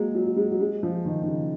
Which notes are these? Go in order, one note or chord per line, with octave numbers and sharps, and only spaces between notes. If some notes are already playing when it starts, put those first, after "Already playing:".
Already playing: F#3 G#3 A#3
F#3
F#3
G#3
F#3
G#3
F3
D#3
D#3
C#3